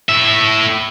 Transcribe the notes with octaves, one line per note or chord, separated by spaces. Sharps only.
A2 E5